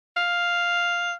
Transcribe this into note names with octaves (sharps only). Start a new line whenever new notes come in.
F5